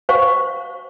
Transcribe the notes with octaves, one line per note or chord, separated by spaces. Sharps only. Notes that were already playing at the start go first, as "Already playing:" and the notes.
C5 F5 C#6